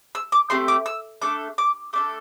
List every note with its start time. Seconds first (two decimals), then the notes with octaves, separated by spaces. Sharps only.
0.15 E6
0.32 D6
0.50 A3 C4 G4 C6
0.68 D6
0.86 E6
1.22 A3 D4 A4 D6
1.58 D6
1.93 A3 D4 A4 D6